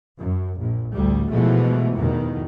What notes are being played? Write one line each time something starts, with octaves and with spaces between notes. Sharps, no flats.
F#2
A#1
A1 D2 G3
B2 E3 F3 G#3 A3
E2 G2 B2 D#3